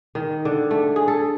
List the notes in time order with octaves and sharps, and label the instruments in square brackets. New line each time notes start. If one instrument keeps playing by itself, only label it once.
[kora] D#3
D3
A3
G#4
A4